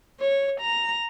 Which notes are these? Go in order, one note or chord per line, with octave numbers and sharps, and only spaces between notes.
C#5
A#5